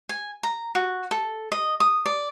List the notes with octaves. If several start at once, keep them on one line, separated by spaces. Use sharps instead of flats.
G#5
A#5
F#4
A4
D#5
D#6
D5